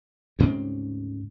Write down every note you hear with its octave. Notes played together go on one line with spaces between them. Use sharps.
D2 G#2 C#3 C4